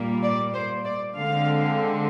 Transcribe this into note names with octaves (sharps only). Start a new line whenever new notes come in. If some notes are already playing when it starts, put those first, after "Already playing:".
Already playing: A#2 G3 A#3
D5
C5
D5
D3 G#3 C4 F5